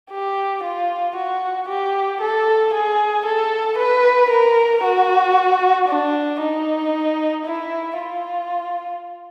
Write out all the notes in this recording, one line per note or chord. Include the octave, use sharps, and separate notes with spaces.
G4
F4
F#4
G4
A4
G#4
A4
B4
A#4
F#4
D4
D#4
E4
F4